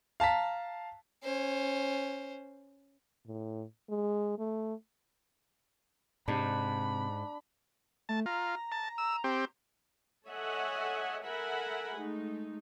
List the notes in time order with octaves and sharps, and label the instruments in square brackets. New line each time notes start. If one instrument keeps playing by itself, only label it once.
[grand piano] F5 A5 A#5 B6
[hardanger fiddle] C#4 C5
[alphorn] A2
G#3
A3
[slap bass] G#2 [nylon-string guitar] C3 [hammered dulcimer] D4 [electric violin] B5
[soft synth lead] A3 [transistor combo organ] A5
[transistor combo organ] F4 [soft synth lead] A#5
[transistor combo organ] A5
E6
C4 G4
[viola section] A4 C#5 D#5 E5 F#5 G#5
A4 A#4 E5 F#5 G#5 B5
G#3 A3 D#4